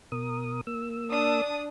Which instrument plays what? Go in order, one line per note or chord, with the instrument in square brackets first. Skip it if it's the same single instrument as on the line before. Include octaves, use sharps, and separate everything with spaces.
[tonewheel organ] B2 A#4 D#6
A#3 E6
[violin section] D4 D#6